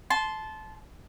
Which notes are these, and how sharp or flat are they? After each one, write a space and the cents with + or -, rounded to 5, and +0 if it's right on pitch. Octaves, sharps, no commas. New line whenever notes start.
A5 -20 C6 -5